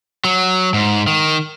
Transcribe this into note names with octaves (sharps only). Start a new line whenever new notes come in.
F#3
G#2
D#3